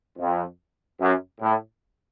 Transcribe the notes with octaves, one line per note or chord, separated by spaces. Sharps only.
F2
F#2
A2